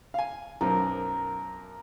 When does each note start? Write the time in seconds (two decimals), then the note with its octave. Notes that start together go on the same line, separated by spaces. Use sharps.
0.14 F5 G#5
0.61 B1 F#2 A#4 C5